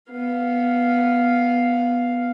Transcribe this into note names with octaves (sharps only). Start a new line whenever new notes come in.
B3 F5